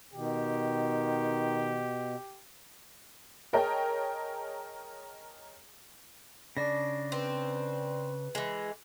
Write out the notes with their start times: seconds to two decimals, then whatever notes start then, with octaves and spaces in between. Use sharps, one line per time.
0.13 B2 D#3 G4
3.53 G#4 A#4 C#5 D#5 G5 A5
6.57 C#3 D4 D5 A#6
7.12 C4 B4
8.35 E3 G#3